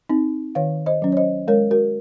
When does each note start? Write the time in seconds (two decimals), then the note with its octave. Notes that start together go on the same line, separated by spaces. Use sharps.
0.09 C4 D#4
0.55 D#3 C#5 F5
0.86 C5 D#5
1.02 F#3 C#4
1.12 C#5
1.17 C5 D#5
1.48 G#3 A#4 C#5
1.71 F#4 A#4